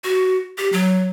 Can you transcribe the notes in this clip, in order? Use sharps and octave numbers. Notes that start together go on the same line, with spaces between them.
F#4
G4
F#3